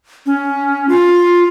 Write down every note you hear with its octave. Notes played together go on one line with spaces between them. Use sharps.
C#4
F4